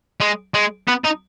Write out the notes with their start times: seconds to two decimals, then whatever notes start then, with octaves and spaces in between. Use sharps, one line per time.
0.21 G#3
0.54 G#3
0.88 B3
1.05 D#4